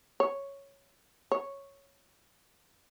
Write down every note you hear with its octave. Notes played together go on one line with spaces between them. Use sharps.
C#5
C#5